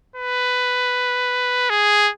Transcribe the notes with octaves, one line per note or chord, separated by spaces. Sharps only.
B4
G#4